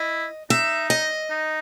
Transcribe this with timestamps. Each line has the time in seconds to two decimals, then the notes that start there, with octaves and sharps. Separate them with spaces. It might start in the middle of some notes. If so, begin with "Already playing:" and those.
Already playing: E4 D#5
0.50 D#4 E5
0.90 D#5
1.30 D#4